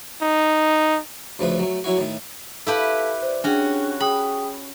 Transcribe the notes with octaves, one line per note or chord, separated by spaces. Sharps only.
D#4
D2 C#3 F3 A3 B4
F#3 A3
F#3 C#4 E4 F#4
A2 D#3
E4 G4 A4 B4 F5 A5
C5 D5
C#4 D4 F#4 G#4 G5
G#4 G5 B5 D#6